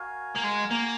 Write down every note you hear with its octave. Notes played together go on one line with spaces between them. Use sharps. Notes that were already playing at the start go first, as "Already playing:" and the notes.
Already playing: F#4 A#4 F5 G#5
A#3
G#3
A#3